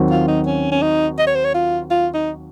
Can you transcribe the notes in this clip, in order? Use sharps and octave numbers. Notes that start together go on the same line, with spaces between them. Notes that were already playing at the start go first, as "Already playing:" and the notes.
Already playing: D#2 D#3 F#3 C4 F#4
F4
D#4
C#4
C#4
D#4
D#5
C#5
C5
C#5
F4
F4
D#4